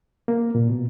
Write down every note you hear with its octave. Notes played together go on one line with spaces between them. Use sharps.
A#3
A#2
B2